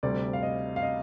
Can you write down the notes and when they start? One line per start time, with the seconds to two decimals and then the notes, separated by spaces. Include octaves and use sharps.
0.03 D2 C3 G3 D5
0.33 F5
0.43 D#5
0.76 F5
0.82 D#5